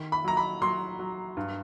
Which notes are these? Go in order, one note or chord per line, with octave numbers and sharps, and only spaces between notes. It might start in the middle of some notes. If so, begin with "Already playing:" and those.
Already playing: D#3
B5
F#3 A#5
B5
F#3 C6
F#3
G2